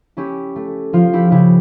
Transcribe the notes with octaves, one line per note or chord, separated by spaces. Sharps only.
C#4 E4 G4
A3
F3 F4
E4 G4
C#3 E4 G4